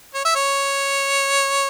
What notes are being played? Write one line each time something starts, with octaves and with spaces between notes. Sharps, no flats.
C#5
E5
C#5